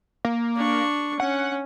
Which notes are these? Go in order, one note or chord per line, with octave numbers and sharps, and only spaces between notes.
A#3
D4 C#6
C#4 F#5